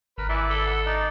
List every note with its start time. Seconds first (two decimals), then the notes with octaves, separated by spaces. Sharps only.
0.18 G#1 A#4 B4
0.29 E3 E4 D5 E5
0.50 A4
0.66 F#5 B5
0.86 D#4 D5